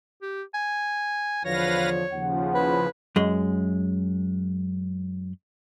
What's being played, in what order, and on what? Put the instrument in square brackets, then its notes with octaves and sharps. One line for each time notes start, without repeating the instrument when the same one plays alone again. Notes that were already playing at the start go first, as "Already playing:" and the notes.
[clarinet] G4
G#5
[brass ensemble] E2 D3 F3 [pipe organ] B4 F5 A#6 [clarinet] C#5
[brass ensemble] D#2 F#5 [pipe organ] C#3 F3
[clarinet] E4 [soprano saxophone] B4
[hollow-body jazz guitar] F#2 G#3